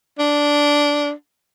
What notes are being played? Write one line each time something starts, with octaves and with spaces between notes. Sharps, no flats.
D4